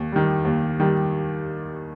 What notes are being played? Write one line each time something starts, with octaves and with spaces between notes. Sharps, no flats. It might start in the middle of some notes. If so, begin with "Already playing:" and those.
Already playing: D#2
D#3 G3
D#2
D#3 G3